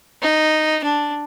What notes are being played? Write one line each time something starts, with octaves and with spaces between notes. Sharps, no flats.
D#4
D4